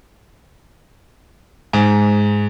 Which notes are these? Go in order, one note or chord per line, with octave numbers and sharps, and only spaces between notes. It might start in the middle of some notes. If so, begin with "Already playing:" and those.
G#2